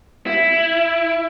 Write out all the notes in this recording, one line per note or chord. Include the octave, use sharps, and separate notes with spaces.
E4